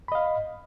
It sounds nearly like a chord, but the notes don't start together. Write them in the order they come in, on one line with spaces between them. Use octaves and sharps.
B5 D#5 F5